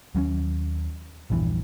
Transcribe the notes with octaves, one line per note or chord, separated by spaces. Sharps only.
D#2 F#3 B3 C#4
A#1 E2 G2 E3